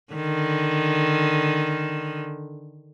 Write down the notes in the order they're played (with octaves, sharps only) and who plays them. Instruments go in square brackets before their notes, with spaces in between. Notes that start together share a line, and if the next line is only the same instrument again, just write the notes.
[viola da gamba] D3 D#3